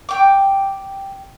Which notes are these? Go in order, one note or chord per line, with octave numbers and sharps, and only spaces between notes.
G5 D6